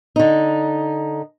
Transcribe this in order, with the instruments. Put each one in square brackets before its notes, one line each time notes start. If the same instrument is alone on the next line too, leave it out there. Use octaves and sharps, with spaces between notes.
[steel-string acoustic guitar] D3 D#4